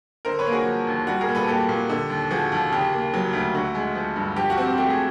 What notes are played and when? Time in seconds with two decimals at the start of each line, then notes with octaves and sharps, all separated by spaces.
0.25 D3 A#4 C5
0.39 B4 C#5
0.46 A#3
0.52 F#4 G#4
0.67 F3
0.87 D#2
1.07 G3 F#4
1.21 G#4 A#4
1.29 A#2
1.35 A4 B4
1.48 A#3 G4 A4
1.69 A#2
1.89 D3
2.10 D#2
2.31 F3 F#4 G#4
2.52 D#2
2.72 C#3 G4
2.93 A#3
3.14 F#3
3.33 D2
3.54 D3 F#4
3.75 G#3
3.95 F3
4.16 G2
4.36 F3 G4
4.50 F#4
4.58 C4
4.65 G4
4.78 A3 G4
4.90 G#4